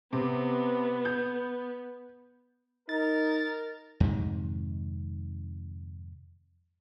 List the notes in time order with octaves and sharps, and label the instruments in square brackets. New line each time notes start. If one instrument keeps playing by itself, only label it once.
[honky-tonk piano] C3 [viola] B3
[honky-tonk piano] G6
[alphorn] D#4 [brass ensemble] A#4 [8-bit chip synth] A6
[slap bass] F2 G#2 C3 D#3